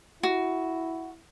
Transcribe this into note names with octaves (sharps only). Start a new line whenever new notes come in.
E4 F#4